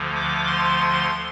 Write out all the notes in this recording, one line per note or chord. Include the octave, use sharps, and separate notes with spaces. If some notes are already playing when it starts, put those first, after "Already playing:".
Already playing: D2 D3 F3
D6
C6